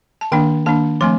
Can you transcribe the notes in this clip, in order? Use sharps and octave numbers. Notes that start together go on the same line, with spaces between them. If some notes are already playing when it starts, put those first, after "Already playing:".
A5
D#3 A#3 D4 G5
D#3 A#3 D4 A5
F3 A3 C4 C6